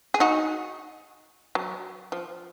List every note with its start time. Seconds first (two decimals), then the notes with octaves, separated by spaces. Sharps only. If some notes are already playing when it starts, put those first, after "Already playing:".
0.14 G#4
0.20 D#4 F#4
1.55 F#3
2.12 F3